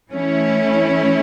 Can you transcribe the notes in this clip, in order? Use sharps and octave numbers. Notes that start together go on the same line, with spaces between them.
E3 A3 C#4 E4